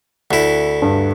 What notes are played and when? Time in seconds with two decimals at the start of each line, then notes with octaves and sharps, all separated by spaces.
0.31 D2 E4
0.82 G2